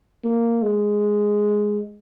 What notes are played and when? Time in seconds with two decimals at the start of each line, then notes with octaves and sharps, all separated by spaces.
0.24 A#3
0.62 G#3